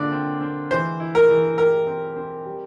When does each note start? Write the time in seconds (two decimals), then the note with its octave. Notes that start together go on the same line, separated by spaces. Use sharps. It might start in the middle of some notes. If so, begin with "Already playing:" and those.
Already playing: D3 A#3 F4 D5
0.12 C4
0.41 C4
0.71 E3 C5
1.00 E4
1.15 A#4
1.29 E3
1.58 G4 A#4
1.87 C4
2.16 C4
2.46 G3